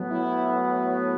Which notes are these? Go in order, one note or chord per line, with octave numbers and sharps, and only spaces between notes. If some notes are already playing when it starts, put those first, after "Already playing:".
Already playing: A2 F#3 B3
E4
E4